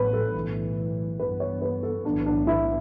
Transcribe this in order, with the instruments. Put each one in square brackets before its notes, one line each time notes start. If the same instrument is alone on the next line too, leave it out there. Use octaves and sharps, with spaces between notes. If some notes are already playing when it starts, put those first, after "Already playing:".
Already playing: [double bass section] A1 A2 F#3 B3 [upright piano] B4
[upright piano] A4
[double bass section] B1 A2 E3
[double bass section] G2 E3 B3 [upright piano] B4
[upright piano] C#5
B4
A4
[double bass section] B1 A2 E3 B3 [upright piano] D4
[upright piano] D4
E4